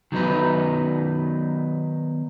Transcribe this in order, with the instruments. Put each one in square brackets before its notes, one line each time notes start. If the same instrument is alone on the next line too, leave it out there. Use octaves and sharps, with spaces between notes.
[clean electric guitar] D#3 F#3 B3 D#4 B4